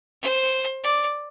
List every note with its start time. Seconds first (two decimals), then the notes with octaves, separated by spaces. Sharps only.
0.22 C5
0.84 D5